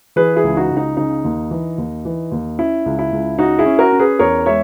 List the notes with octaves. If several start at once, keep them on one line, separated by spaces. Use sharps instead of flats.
E3 G#4 B4
E4 G#4
C#2
D#4 F#4
C#2
D#4
C#3 D#4
D#2
E3
D#2
E3
D#2
C#4 E4
C#2
E4
C#2
C#4 D#4 F#4
E4 G#4
C#4
F#4 A#4
C#4
G#4 B4
E2 A#4 C#5
G#3 C#5 E5